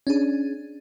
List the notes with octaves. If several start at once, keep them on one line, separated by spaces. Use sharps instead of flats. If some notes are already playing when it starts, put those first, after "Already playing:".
C#4 D4 G#4